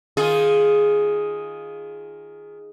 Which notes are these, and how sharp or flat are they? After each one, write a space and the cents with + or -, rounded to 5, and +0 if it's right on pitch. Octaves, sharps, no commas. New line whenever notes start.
D#3 +0 F4 +0 G#4 +0